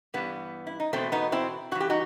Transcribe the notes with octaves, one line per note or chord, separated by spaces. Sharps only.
G2 E3 G3 B3
E4
D#4
E2 B2 A3 C4
B3 D#4
C4 E4
G2 E3 F#4
G4
D#4 F#4